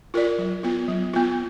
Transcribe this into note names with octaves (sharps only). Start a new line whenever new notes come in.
F4 A#4 D5
F#3
B3 F4
F#3
B3 F4